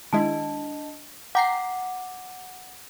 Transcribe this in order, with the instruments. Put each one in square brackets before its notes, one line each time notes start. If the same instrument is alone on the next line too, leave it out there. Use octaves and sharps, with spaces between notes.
[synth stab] D#3 G#3 E4 [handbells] D4 D#5 A5
[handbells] F#5 D6 [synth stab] G5 A#5 C7